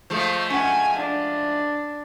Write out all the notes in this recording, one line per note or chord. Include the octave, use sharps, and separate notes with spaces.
F3 G#3 A3
C#4 F#5 G#5
D4